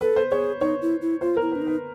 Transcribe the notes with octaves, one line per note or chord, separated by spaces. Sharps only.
A4 B4
C5
G#4 C#5
D#4 C#5
E4
E4
F4 C5
E4 A#4
D4 B4
D#4 B4